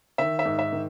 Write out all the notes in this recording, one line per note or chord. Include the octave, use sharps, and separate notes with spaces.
D#3 E5
E5
G#2
E5
D#3